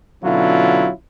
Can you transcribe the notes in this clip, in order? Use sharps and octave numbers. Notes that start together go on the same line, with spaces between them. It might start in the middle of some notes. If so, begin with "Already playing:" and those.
B2 D3 F#3 C#4 E4 F4